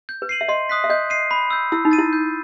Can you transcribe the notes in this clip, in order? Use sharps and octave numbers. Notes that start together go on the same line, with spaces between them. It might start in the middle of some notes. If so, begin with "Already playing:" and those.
G6
B4
C7 D#7 F#7
E5
D#5 C6
D#6 F#6 B6
E5
D#5 G6
C7 D#7
B5
E6 G6
E4 E6
D#4
A6 D#7
E4
G6